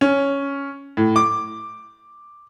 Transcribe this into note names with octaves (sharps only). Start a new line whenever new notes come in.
C#4
A2
D6